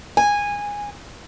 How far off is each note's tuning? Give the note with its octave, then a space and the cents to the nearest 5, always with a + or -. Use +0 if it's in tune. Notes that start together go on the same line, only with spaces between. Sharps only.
G#5 -15